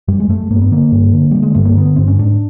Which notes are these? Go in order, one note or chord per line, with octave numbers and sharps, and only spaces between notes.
F#2 G3
G#3
F#2 A3
G2 A#3
B3
D3 A#3
G2
D3
D3 G3
G#3
G2 A3
A#3
D3 B3
G2 C4
C#4
G#2 D4